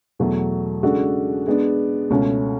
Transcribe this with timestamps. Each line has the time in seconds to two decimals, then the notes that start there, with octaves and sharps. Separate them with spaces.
0.19 E2 B2 F#3 A3
0.83 C#3 G#3 D4 F#4 A4
1.47 G#3 B3 D4
2.10 C#2 B2 A3 C#4